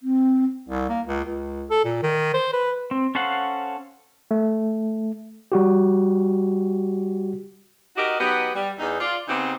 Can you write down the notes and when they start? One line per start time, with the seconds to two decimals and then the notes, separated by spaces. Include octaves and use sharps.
0.03 C4
0.68 C2
0.89 A#3
1.06 C#2
1.25 C#2
1.70 A4
1.85 A#2
2.03 D#3
2.34 C5
2.53 B4
2.91 C4
3.15 C#4 A4 C5 F5 F#5
4.31 A3
5.52 G3 F#4 G4
7.97 D#4 F#4 G4 A#4 D#5
8.19 F#3 B3 D#4 G4 D#5 F#5
8.55 G3
8.79 E2 D#4
9.00 F4 D5
9.28 C#3 B3 C4 D#4 G4